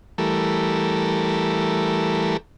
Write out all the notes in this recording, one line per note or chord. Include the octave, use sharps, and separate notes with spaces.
E3 G3 A3 A4 A#4